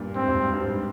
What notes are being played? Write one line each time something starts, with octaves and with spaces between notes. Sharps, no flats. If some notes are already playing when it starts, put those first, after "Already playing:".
Already playing: G2 A#2
G#2 C4
G2
G#2
G2
G#2